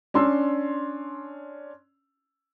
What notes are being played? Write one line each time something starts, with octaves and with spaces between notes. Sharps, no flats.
C#4 D4 C6 E6